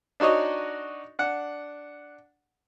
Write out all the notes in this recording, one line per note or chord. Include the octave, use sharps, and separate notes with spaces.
D4 D#4 F#4 C#5 D#5
D4 F#5